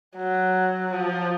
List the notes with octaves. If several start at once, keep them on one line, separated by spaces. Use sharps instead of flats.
F#3
F3